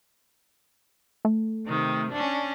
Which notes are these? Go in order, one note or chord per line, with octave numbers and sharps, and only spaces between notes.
A3
C3 D#3
C#4 D4